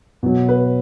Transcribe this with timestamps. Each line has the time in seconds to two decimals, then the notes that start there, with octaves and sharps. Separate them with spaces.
0.23 B2 F#3
0.49 B4